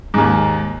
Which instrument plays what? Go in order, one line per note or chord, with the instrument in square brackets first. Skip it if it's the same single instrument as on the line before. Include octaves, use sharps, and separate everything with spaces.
[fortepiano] D#2 G#2